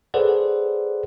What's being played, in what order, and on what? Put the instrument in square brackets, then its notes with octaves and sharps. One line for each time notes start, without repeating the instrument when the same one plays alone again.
[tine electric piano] G#4 A4 B4 C5 D5 F#5